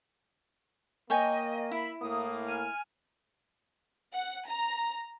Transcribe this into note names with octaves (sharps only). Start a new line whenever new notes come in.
A#3 C#5 D#5 G5 G#5
E4 E5 B5
A2 A#3 D#6
G#5 F6
F#5
A#5